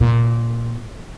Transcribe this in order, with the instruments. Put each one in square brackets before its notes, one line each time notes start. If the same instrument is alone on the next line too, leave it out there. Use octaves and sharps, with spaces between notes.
[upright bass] A#2